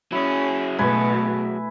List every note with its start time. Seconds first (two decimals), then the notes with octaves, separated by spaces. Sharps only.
0.12 F#3 C#4 E4 G#4
0.79 B2 A3 B4 G#5